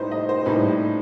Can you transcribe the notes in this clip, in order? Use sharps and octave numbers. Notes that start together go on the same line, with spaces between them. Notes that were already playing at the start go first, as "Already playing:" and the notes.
Already playing: A2 G3 D#4 B4 C5
D#5
C5
A2 G3 D#4 B4